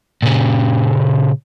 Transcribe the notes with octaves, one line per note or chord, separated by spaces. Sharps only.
A#2 C#3